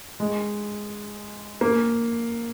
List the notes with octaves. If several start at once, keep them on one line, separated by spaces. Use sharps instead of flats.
G#3
A#3